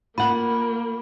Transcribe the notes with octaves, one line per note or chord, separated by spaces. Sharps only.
A#3 F4 F#5 B5